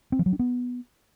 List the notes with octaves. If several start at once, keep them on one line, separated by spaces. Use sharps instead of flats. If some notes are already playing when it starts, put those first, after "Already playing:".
C4
F3
F#3
D4
B3